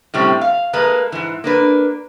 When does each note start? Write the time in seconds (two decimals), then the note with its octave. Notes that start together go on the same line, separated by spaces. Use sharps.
0.14 A2 C3 G3 C4 C#4 G4
0.41 F5
0.73 G#3 A#3 B4 A5 A#5
1.12 G#2 E3
1.44 A#3 D4 B4